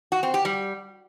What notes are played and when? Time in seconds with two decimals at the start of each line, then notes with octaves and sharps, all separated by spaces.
0.12 F#4
0.23 C4
0.34 G4
0.45 G3